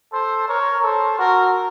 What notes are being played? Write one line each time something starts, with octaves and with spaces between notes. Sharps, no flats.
A4 C5
A#4 C#5
A4 C5
F#4 A#4